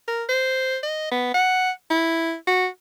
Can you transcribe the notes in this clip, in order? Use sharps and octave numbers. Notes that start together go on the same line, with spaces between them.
A#4
C5
D#5
B3
F#5
E4
F#4